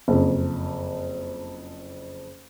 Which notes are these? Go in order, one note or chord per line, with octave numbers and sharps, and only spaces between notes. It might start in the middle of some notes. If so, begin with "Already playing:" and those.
F#1 F2